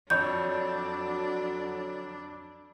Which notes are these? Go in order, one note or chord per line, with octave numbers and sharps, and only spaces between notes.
F2 D3 F#3 D4 F#4 C#5 G6